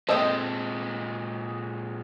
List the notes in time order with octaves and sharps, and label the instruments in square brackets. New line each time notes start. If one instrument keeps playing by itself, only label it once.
[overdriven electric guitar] A#2 G#3 [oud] C4 C5 [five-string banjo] A4 D#5 G5